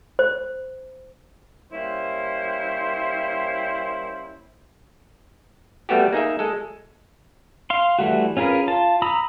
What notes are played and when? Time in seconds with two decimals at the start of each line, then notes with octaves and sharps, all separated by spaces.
0.19 C5
1.72 G3 A#3 C#4 E4 C5
5.89 G3 A3 B3 F#4 G4
6.13 A#3 D#4 G#4 E5
6.39 G#3 A4
7.70 F5 C6
7.99 E3 G3 A3 F#4
8.37 C#4 F4 G#4 A#4 B4
8.68 F4 A5
9.02 A#5 B5 D#6 E6